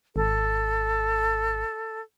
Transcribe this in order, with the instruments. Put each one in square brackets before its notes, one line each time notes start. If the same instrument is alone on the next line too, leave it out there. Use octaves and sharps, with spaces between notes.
[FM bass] G#1 [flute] A4